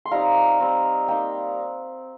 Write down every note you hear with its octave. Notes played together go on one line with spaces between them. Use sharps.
C6
G3 C4 D#4 F5 A#5
G3 C4 D#4
A#3 D#4 G5